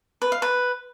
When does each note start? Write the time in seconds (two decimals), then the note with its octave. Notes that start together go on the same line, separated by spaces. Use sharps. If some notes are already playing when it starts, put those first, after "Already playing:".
0.22 B4
0.32 F5
0.42 B4